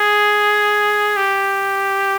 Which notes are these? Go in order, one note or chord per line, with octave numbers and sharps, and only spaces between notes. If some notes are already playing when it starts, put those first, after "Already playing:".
Already playing: G#4
G4